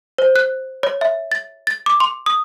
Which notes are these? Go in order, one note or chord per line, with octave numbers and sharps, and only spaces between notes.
C5
F#6
C#5
E5
A6
A6
D6
C6
D#6